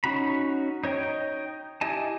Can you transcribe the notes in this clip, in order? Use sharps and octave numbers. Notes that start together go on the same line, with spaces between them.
C#4 D#4 F#4 A#5 B5
D#4 C#5 D#5 G5
E4 G4 D#5 G#5 A5